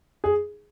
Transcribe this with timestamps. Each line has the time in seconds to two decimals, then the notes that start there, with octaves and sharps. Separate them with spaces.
0.24 G#4